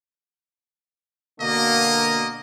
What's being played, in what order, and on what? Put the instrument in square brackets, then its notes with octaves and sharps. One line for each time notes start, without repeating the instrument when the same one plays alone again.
[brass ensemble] B2 D3 A#3 [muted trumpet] D#5